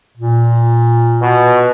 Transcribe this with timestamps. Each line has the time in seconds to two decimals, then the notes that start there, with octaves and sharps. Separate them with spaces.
0.17 A#2
1.22 B2